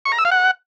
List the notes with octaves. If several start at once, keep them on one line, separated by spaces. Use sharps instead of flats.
C#6
A#5
E6
F5
F#5